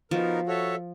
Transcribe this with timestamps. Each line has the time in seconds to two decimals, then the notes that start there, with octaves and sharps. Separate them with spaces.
0.11 F3 B3 D#4 F#4 A#4
0.47 F#4 A4 C#5 E5 A5